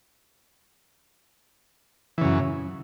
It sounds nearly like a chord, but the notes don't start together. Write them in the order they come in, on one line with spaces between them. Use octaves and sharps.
E3 C#3 F#2